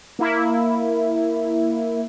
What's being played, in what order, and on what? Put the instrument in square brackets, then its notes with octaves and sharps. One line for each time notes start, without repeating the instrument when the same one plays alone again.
[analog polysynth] A#3 E4